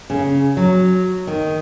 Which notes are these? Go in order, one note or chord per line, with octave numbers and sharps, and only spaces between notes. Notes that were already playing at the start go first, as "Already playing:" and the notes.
C#3
F#3
D#3